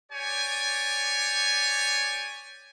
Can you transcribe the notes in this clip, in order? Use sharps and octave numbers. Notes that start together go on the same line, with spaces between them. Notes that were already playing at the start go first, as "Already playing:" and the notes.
G4 C#5 D5 G#5